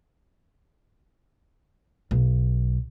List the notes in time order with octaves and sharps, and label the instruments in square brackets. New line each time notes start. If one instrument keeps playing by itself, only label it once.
[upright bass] B1